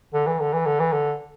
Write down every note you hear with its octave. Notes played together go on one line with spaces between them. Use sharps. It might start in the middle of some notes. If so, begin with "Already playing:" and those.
D3
E3
D3
E3
D3
E3
D3